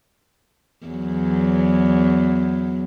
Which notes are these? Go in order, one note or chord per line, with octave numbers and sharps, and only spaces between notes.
E2 F#3